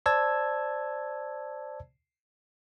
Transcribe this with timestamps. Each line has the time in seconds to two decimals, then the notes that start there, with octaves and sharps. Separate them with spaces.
0.06 C5 D5 A5 E6 G#6